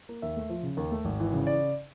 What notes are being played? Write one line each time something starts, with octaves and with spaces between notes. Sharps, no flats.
A#3
D#2 E5
A3
F3
C#3
D#2
A3
G#1
E3
C#3
D5